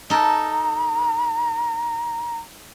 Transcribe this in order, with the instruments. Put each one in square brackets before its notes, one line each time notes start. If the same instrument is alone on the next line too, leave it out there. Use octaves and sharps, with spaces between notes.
[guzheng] D#4 A4 [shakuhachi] A#5